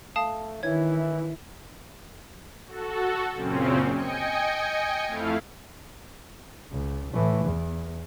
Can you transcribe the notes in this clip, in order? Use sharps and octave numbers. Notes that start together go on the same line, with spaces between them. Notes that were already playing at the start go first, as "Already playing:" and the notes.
A3 F5 A5 D#6
D#3 E3 E4 C#5 G#6
F#4 A4
F#2 A#2 C#3 C4 C#4
D#5 G5 G#5 C#7
F2 A3 E4 F5
C#2
A2 E3
E2